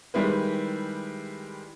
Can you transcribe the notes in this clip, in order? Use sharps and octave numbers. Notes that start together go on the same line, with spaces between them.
D#3 G3 G#3 E4 B4